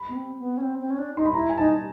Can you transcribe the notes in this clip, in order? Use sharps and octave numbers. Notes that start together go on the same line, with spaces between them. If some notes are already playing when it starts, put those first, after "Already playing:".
Already playing: B5
B3
C4
B3
C#4
C4
C4
C#4
D4
D#4 C6
B5
E4 A#5
G#5
D#4 A5